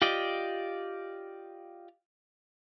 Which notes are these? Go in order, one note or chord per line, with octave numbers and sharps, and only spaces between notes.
F4 G4 D5 D#5